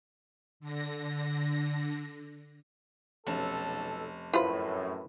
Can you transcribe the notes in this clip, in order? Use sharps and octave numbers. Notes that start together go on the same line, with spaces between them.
D3 A#6
F1 B1 C#4 A4 A5
F#2 A2 E4 F4 B4 C5